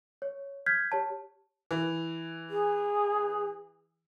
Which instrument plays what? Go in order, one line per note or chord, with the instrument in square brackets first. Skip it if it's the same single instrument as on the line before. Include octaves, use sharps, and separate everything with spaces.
[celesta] C#5
F6 G6 G#6 B6
G4 C#5 A5
[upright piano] E3
[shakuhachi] G#4